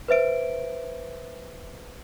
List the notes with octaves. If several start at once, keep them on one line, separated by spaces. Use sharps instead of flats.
B4 C5 E5 D7